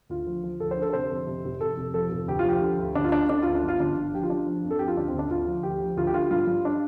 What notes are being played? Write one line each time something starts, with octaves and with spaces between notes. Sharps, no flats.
D2 F4
F3
F3
D2 A4
C5
D3 A4
A4
C3 C5
F2
C3
F1
F1 A4
F1
F3 A4
F1
D2 G4
F4
F3 G4
D3
D2
D2 D4
F4
D2 D4
D3 D4
D2 F4
D4
G1
F4
G1 D4
G1
F3 G4
F4
F3 D4
F3
F2
A4
F2 G4
F4
D2 D4
D2 C4
D4
D2 F4
F3
D2 G4
F3
D2 F4
G4
D3 F4
G2 F4
G2
D4